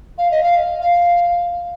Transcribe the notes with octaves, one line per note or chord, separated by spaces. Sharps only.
F5
D#5
F5
F5